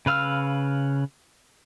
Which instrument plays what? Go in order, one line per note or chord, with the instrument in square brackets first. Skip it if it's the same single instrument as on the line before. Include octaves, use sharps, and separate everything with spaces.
[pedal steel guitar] C#3 B4 F5 E6 F6